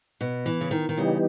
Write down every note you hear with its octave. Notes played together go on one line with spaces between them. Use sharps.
B2
E3
C#3
D#3
D#3
C#3 E3 G3 B3 D#4 G4